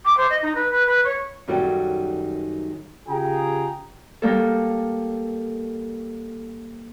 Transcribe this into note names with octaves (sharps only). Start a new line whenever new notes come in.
D6
C5
D#5
D#4
B4
B4
B4
C#5
F#2 D#3 G3 C#4 F#4 A4
C#3 F4 G4 G#4 G5 A#5
G3 A#3 A4